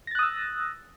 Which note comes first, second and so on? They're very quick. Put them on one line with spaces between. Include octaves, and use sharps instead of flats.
A#6 A6 F#6 D#6 E6